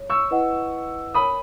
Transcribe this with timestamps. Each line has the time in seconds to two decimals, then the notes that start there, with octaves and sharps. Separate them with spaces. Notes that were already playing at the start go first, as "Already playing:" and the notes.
Already playing: C#5
0.10 C#6 E6
0.31 E4 B4 D#5 F#5
1.14 A#4 C#5 G#5 B5 D#6